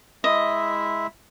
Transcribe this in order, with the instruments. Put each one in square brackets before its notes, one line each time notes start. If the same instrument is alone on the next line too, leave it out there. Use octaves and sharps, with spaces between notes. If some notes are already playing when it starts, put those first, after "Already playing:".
[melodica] G#3 E4 E5 [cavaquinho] D#5